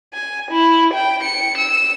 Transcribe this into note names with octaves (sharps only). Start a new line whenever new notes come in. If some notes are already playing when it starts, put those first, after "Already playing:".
G#5
E4
G5
C#7
E6